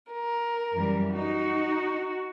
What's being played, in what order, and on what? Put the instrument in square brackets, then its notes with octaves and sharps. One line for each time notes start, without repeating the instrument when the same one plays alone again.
[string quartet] A#4
[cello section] F#2 E3 G3
[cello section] D#4 [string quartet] F#4